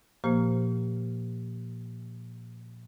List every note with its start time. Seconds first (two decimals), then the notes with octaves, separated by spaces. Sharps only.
0.24 A#2 F3 A#3 G4 C5 F6